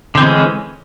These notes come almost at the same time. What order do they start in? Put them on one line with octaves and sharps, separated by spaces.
D3 C4 E3 G#3 C#4